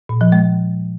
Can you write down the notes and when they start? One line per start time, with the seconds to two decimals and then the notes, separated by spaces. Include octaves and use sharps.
0.09 A#2
0.21 F3
0.32 G#3